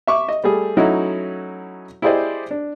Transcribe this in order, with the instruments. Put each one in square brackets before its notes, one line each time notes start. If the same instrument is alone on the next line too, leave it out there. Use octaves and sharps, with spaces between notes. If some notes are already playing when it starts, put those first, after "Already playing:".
[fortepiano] E5 C#6 D6
D#5
G3 A3 G#4
F#3 A3 C#4 D#4 E4 F#4
E4 G4 G#4 C5 D5 D#5
D4